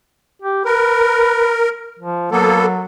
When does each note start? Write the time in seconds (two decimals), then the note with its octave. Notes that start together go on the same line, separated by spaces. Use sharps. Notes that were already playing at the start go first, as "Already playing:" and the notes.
0.42 G4
0.65 A#4 B4
1.99 F3
2.32 F#3 A#3 B3 A4